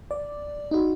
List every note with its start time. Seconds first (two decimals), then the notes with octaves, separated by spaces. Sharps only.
0.11 D5
0.71 D#4 F#4